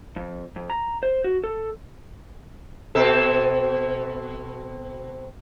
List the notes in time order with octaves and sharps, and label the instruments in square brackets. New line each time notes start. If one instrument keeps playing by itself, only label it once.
[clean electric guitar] F2
F2
A#5
C5
F#4
A4
[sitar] B2 C4 A4